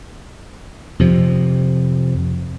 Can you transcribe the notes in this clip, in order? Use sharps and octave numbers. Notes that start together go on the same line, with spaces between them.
F2 C3 F3